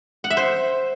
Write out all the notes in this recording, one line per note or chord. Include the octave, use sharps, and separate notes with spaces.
F#5
E5
C5